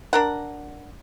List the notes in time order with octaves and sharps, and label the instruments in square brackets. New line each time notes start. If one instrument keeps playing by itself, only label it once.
[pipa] D4 A#4 F#5